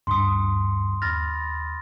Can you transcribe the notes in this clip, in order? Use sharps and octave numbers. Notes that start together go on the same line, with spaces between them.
D2 G2 C6 D#6
D#2 B5 F6 A6 A#6